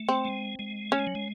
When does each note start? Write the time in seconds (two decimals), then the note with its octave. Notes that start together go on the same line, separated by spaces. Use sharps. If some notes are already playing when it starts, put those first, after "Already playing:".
Already playing: A3
0.09 C4
0.25 G#3
0.59 G#3
0.91 A3 C#4
0.99 G#3
1.07 F#3
1.15 G#3